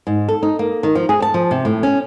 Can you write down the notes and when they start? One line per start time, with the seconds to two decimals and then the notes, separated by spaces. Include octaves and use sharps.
0.07 G#2
0.29 A4
0.43 D#4
0.59 A#3
0.83 D#3
0.95 F3
1.09 G#4
1.22 A5
1.34 F3
1.51 C3
1.65 A2
1.83 C#4